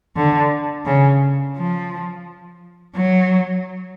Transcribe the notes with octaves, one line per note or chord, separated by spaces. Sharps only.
D3
C#3
F3
F#3